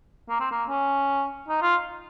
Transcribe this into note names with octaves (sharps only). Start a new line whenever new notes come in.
A#3
C4
A#3
C#4
D#4
F4